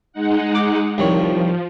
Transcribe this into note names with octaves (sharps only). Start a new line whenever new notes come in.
G#3 D#4 F#5
D6
C2 D#3 F3 C#5